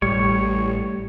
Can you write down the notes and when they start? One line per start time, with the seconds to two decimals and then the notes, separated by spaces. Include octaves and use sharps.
0.02 A1 A2 G3 C#5